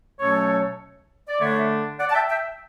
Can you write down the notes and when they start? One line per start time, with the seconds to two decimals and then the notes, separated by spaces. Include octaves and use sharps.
0.20 B2 F#3 A3 C#4 A4 C#5
1.28 D5
1.40 D3 A3 D4 C#5 E5
1.99 D5 F#5
2.10 A5
2.14 E5 G5
2.29 E5 G5